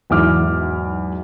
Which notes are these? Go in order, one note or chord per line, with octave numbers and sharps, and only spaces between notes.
B1 E2 G#2 E4 D6 F6